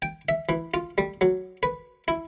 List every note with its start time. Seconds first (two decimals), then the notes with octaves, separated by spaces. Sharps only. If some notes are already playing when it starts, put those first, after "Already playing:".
0.02 G5
0.29 E5
0.49 E3
0.74 F4
0.98 G3
1.21 F#3
1.63 B4
2.08 E4